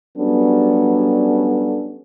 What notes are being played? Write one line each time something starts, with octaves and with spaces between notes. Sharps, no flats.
F#3 G3 B3 C#4 D4 A4